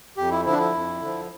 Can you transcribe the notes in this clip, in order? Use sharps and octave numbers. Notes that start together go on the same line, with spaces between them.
F2 G4
E4
D3 F3 E4
D4
E4
F2
D3
F3